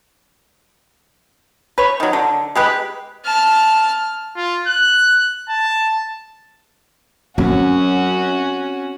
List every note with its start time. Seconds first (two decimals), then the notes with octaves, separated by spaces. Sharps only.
1.78 B4 C#5
2.00 D#3 F#3
2.13 D3
2.55 G#3 G4 B4
3.24 A5 F6
4.36 F4
4.67 F#6
5.49 A5
7.38 F#2 C4 C#4 F#4